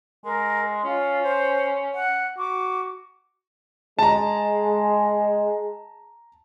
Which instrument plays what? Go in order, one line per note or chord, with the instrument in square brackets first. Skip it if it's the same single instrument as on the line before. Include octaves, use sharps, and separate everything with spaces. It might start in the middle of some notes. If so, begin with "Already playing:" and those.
[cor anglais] G#3 [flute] A#4
[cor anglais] C#4 [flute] F4
[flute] C5
F#5
[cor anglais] F#4 [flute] D6
[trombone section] G#3 [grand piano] A5 A#5